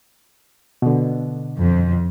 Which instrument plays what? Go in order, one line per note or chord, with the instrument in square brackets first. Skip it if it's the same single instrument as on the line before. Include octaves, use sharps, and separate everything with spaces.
[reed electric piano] B2 D3
[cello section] F2